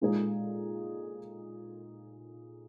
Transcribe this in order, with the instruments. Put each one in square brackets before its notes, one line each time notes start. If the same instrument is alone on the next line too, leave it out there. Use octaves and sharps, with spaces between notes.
[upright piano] A#2 G#3 D#4 G#4